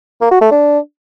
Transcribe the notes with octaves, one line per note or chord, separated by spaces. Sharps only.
A#3
F#4
A3
D4